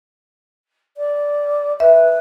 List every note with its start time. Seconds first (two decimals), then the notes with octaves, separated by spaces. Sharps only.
0.97 D5
1.80 B4 E5